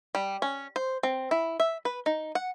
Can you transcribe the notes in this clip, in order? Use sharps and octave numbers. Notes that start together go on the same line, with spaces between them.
G3
C#4
C5
C4
E4
E5
B4
D#4
F#5